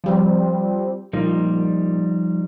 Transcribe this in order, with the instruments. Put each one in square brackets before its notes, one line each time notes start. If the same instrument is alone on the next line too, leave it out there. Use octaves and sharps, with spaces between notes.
[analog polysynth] F3 G3 C4
[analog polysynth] A#2 [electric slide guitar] F3 G3 D#4